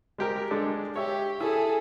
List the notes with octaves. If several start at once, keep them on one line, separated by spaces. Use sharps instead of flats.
G#3 G4 A#4
G#3 D4 A4
G4 C#5 E5
E4 G#4 A4